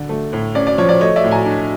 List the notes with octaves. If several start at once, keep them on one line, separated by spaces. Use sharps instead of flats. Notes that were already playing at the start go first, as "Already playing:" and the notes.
Already playing: D3 D5
A3
A2
C#4 D5
D5
F3 C#5
D5
A3 C#5 D#5
D5 E5
A2
G#5 A#5
D4